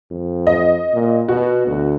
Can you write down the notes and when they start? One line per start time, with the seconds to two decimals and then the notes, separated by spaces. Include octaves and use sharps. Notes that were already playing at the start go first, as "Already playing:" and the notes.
0.11 F2
0.47 D#5
0.93 A#2
1.28 B2 F#4
1.67 D2